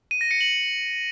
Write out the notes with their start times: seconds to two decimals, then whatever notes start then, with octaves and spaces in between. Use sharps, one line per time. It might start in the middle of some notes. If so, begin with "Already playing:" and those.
0.11 D#7
0.21 A#6
0.31 C#7
0.41 F#7